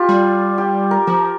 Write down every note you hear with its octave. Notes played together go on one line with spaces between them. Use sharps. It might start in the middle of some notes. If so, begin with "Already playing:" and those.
Already playing: F4 G4
G3
G4
A#4
F3 A#4